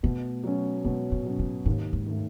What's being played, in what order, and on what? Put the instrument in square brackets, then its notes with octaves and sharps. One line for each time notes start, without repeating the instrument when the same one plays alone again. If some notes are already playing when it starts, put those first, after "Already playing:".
[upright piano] B2 [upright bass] A3
[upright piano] F#3 C#4
[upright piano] B2 [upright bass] G#3
[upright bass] A2
[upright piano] F#3 C#4
[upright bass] A2
[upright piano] D#2 [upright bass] G#2
[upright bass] G#2
[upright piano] D#3 A3